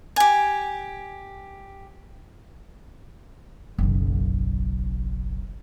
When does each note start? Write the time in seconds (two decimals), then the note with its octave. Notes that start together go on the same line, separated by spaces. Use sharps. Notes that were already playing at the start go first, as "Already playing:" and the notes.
0.16 G4 G#5
3.78 F#1 B1